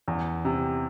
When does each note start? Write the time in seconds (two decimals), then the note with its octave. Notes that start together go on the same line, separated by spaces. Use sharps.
0.08 E2
0.45 C3